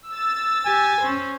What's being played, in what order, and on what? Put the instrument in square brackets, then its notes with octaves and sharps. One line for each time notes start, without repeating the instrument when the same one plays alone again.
[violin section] E6 A6
[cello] G4 [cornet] G#5
[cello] C#4 C5